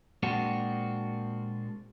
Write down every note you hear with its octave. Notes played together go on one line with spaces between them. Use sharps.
A#2 G#3 A#3 C4 D4 F#4